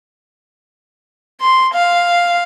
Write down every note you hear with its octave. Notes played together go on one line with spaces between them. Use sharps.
C6
F5